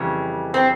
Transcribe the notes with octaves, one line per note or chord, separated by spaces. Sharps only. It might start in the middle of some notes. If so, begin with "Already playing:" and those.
Already playing: F2 C#3 E3 G3
C4